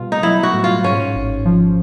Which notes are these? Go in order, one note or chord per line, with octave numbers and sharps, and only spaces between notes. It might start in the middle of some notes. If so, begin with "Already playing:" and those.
Already playing: B2 G3 F4
D#4
F#3 E4
F#4
A2
F4
G#2 C#4
G#1
F3